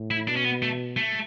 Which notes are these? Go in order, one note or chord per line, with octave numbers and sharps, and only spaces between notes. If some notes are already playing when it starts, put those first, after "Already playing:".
Already playing: A2
E4
B2 D4
C#4
B3
A3
A3